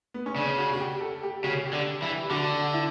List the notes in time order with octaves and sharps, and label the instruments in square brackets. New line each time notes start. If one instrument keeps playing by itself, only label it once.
[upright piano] B3
C#4
[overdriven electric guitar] C#3 [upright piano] D4
[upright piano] F#4
F#4
G4
A4
G4
[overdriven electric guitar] C#3 [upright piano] F#4
[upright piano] G4
[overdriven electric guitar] D3
E3
[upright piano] G4
[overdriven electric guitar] D3 [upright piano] F#4
[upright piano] E4